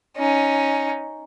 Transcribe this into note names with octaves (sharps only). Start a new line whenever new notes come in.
C#4 D#4